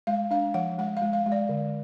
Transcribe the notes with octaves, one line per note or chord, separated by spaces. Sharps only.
G#3 F5
D4 F5
F3 F#5
G#3 F#5
G#3 F5
F5
G#3
D5
D3